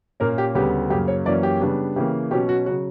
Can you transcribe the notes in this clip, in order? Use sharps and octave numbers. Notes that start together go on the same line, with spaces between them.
A#2 A#3 C#4 A#4
G4
D2 C#3 G3 B3 G4
F#2 C#3 F#3 A#3 G4
C#5
F#2 E3 A#3 C#4 D5
G4
C#3 G3 B3 D4
C#3 E3 A#3 G4
B2 F#3 C#4 G4
F#4
C#3 F#3 F#4